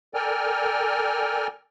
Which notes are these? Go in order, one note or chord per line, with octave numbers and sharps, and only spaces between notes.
A4 A#4 D5 G5 G#5 F6